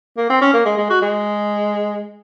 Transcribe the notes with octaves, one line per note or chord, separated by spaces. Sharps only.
A#3
C4
C#4
A#3
G#3
G#3
F#4
G#3